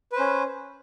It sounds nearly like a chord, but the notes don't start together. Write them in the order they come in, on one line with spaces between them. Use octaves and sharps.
B4 C5 C#4